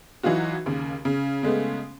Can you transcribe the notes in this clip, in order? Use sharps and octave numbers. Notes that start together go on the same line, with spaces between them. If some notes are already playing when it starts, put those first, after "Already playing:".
E3 F#3 D#4 F4 F#4
D#2 C#3
C#3
C#3 G#3 A3 B3